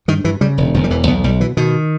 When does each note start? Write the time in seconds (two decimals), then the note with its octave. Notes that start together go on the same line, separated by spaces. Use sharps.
0.08 G2 D#3
0.24 G2 E3
0.41 C#3 G3
0.58 E1
0.74 E1 D#3
0.84 G3
0.90 E2 E3
1.07 B1 B3
1.24 B1 G3
1.40 B2 E3
1.57 B2 D#3